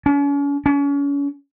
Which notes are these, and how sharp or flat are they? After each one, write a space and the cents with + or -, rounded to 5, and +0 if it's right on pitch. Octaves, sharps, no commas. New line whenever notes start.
C#4 +40
C#4 +35